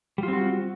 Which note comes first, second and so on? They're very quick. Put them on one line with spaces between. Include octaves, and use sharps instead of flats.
G3 F4 C4 F#4